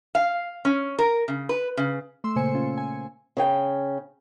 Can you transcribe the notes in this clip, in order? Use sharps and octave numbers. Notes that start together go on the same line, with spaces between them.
F5
C#4
A#4
C#3
B4
C#3
A3 C6 E6
A#2 C#3 A#3 C5 G#5 C#7
C#4 F4
G#5
C#3 C#4 G5